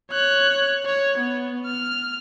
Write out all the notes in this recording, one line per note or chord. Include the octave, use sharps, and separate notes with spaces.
C#5 F#6
C#5
B3
F6